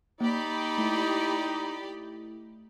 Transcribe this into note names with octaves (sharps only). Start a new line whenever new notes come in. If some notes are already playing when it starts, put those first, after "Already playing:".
A#3 D#4 G4 D5 B5
A3 E4